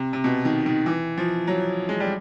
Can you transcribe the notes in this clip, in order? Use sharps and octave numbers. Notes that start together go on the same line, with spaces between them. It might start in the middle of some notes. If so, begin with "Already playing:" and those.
Already playing: C3
C3
B2
D#3
D#3
E3
F3
F#3
G#3
G3